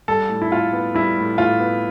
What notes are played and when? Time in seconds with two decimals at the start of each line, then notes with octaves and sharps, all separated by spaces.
0.08 G3 A4
0.29 A2
0.42 E4
0.51 A2 F4
0.73 B3
0.94 G3 E4
1.17 A2
1.38 A2 F4
1.60 B3